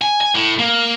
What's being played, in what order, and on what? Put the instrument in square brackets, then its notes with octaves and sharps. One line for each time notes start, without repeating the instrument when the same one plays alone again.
[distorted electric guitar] G#5
G#5
A2
A#3